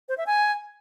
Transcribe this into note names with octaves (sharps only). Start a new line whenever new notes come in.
C5
E5
G#5